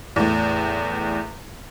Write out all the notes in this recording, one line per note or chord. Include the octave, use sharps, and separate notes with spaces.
E2 A2